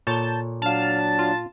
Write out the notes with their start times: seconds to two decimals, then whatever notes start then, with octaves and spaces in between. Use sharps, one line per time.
0.07 A#2 A4 C#5 A5 G6
0.62 F#3 D4 F5 A5 F6
1.19 F4